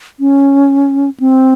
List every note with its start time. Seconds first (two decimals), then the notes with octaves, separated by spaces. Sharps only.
0.20 C#4
1.20 C4